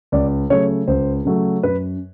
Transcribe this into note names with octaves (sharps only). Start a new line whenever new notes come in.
C#2 D5
C#3 F#3 A3 C#5
C#2 C5
C#3 F#3 A3
F#2 B4